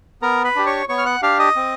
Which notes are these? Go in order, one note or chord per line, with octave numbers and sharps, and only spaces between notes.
B3 A#4 A#5
B4 B5
D4 G4
C#5 C#6
B3 C#5 C#6
F6
F#5 F#6
D4 G4 F5 F6
D#5 D#6
C4